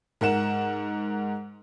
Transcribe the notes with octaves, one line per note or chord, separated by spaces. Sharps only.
G#2 A#4 F#5 E7